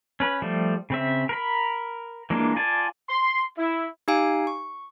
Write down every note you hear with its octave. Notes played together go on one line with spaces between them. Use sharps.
C#4 B4
F3 G3 A3
C#3 C4 E5
A#4 B5
E3 G#3 A#3 D4 F4
F4 D5 G#5 A5
C6
E4
D#4 G4 F5 G#5 D7
C#6